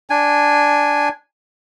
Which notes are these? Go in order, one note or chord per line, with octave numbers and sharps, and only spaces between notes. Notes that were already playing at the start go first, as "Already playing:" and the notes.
D4 G#5